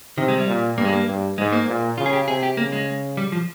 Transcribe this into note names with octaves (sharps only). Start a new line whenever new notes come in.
C3 D#3
G#3
G3
A#2
G2 A#3
G#3
A#3
G2
G#2 G#3
A#3
A#2
C#3 F4
G#4
G4
C3 G#4
G4
C#3 A#3
G#3
G3
F3